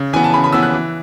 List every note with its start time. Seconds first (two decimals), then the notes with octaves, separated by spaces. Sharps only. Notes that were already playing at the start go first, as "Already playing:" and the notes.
Already playing: C#3
0.13 E3 B3 G#5
0.24 A5
0.34 C#3 B5
0.44 B5
0.52 E3 B3 E6
0.63 F#6
0.73 E3